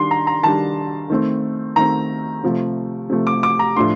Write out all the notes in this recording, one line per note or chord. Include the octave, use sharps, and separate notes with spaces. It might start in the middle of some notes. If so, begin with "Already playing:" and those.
Already playing: D#3 G3 D4 C6
A#5
A#5
D#3 G3 D4 A5
D#3 A3 C4
D#3 A3 C4 A#5
C3 F3 A3
C3 F3 A3
D6
D6
A#5
A2 F3 A3 D4 C6